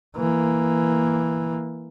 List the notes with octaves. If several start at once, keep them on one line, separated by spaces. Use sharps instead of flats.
E3 A#3